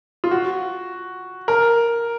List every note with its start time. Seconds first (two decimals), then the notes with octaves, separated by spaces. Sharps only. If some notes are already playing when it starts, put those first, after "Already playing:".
0.24 F4
0.31 F#4
1.48 A#4